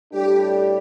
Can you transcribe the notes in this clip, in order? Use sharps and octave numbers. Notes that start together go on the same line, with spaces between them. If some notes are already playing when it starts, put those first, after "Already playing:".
A2 G3 D4 G4 A4 D5